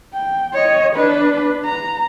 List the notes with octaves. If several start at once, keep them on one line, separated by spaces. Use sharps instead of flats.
G5
C#5 D#5
D4 B4
A#5